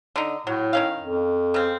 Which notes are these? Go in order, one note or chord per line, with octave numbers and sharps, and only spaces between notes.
D3 D#4
A2 F#3
D#3 C#4 F5
F2
C#3 C4